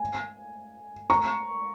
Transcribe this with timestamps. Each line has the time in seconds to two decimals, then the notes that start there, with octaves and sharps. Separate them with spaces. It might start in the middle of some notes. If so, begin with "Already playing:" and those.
Already playing: G#5
1.10 A#5 C#6